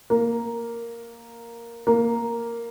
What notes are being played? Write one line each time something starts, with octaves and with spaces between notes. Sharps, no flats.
A#3
A#3